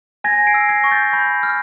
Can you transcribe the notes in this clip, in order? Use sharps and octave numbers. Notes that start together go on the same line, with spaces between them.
G#5 G#6 A#6
C7 D7
E6
G#6 A#6
C#6
G6 A6
B5 G6
F6